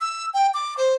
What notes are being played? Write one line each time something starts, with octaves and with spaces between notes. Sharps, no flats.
E6
G5
D6
C5